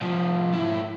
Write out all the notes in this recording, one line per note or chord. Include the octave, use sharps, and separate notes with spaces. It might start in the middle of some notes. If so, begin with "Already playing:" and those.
C2 F3
G#2 E4